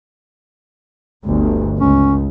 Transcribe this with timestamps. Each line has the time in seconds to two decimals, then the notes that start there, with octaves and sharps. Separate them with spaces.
1.25 G1 D2
1.80 C#2 C#4